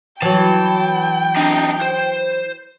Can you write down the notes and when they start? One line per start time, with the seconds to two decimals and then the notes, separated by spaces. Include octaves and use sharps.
0.22 E3 F#3 G5 A5
1.37 D4 D#4
1.82 C5